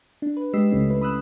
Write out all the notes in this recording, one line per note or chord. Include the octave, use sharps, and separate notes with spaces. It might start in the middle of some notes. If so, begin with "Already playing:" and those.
D4
B4
G#3 G4 D#5 E6 B6 C7
C#2 C#3 G3 A3 C#4
E4 B4
B5 D#6 E6 F#6